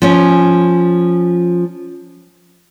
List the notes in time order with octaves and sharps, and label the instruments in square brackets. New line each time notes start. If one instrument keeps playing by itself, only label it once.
[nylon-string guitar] F3 C#4